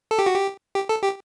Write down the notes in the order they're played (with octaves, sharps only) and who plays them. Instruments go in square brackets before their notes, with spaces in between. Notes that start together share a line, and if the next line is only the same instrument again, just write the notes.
[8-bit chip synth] A4
G4
F#4
G4
G4
A4
G4